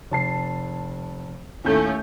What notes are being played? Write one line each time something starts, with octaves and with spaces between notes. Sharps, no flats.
F1 A5 C7
D#2 A2 A3 C#4 G6